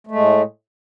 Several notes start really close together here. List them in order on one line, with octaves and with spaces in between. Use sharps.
A3 G#3 A2